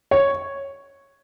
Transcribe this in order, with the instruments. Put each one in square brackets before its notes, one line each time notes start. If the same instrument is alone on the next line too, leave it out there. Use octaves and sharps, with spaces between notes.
[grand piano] C#5